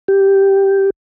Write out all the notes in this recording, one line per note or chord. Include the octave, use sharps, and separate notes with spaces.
G4